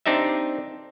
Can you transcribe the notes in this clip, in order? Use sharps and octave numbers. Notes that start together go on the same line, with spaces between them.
C4 D4 D#4 G4 E5